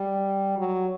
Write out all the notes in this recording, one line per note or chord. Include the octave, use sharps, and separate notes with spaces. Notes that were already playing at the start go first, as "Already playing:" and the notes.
Already playing: G3
F#3